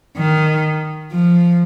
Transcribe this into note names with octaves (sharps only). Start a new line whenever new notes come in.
D#3
F3